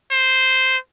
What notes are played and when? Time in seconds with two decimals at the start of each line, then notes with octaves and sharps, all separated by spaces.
0.11 C5